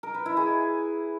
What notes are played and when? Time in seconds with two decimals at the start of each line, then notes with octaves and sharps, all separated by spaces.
0.03 A#4
0.14 B4
0.26 E4
0.37 G#4